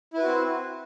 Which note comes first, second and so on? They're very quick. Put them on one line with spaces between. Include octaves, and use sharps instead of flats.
E4 B4 F#4 C4